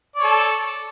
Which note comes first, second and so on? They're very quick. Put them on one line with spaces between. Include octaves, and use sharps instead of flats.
D5 C#5 A4